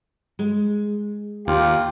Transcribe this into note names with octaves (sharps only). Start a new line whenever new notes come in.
G#3
D#2 F4 G4